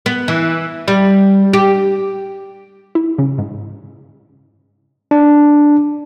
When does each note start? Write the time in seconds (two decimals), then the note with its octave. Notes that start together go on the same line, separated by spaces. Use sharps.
0.06 B3
0.28 E3
0.88 G3
1.53 G4
2.95 E4
3.18 C#3
3.38 G#2
5.11 D4